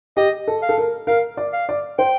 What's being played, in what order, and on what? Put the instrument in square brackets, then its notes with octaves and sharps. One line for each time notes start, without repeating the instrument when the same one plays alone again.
[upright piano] G4 [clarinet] D#5
[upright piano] A4
[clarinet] F5
[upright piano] A4
A#4
[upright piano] A#4 [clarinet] F5
[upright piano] D5
[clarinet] F5
[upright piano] D5
[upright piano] C5 [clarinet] G5